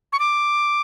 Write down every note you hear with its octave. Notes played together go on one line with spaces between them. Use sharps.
C#6
D6